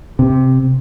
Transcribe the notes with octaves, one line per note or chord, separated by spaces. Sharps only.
C3